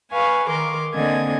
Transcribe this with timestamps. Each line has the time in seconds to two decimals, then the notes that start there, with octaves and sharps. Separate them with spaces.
0.11 B4 F5 G#5 C#6
0.48 D#3 A#4 C6 D6
0.94 D3 A#3 C4 D#5 G#5 G#6